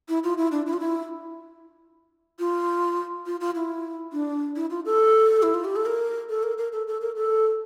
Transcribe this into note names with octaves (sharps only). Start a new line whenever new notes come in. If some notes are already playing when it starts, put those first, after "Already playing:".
E4
F4
E4
D4
E4
F4
E4
F4
F4
F4
E4
D4
E4
F4
A4
E4
F4
G4
A4
A#4
A4
A#4
A#4
A4
A4
A#4
A4